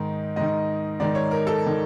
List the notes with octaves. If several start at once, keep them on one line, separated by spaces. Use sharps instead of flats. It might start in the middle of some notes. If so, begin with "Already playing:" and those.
Already playing: G#2 D#3
G#2 D#3 D#5
G#2 D#3 D5
C#5
A#4
A4
D#3